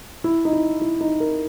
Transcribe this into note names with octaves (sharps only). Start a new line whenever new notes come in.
E4
D#4
E4
E4
D#4
A#4